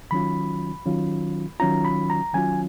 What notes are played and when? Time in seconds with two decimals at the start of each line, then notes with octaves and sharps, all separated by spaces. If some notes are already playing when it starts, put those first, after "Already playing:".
0.11 D#3 F#3 C#4 F4 B5
0.86 D#3 F#3 C#4 F4
1.60 D#3 F#3 C#4 F4 A#5
1.85 B5
2.10 A#5
2.34 D#3 F#3 C#4 F4 G#5